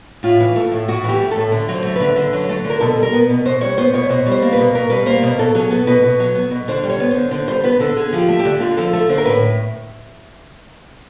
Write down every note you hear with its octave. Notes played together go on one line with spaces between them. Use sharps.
A2 F4
E3
A3
A2
A2 F#4
E3 G4
A3
A2 A4
D3
F#3
C5
A3
D3 B4
D3
F#3
A3
D3
A#4
B2 A4
G3
A#4
B3
B2
B2 C5
G3 C#5
B3 C5
B2 C#5
B2 C5
G3
C5
A#3
B4
B2
B2 A#4
G3 B4
A#3 C5
B2
B2 A4
F#3 G#4
B3 A4
B2 B4
B2
F#3
B3
B2
D3 C5
G3
C#5
B3
D3 C5
D3 C5
G3 C5
B3 B4
D3 A4
D3 G#4
F3
G4
A3
G4
D3
D3 F4
F3 A4
A3 A4
D3 C5
A#4
A2 B4